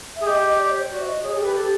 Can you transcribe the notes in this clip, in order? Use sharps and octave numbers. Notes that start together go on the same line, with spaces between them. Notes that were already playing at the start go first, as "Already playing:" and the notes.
G#4 E5
G4 D#5
D#5
D5
C#5
C5
F#4 D5
E5
D#5
G#4 C#5
G#4 A4
G4
B4
A4